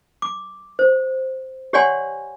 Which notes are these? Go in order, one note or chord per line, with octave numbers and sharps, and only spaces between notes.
D6
C5
G4 C#5 D5 F#5 G#5 C6